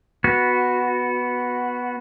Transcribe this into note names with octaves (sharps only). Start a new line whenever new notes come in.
B3 F#4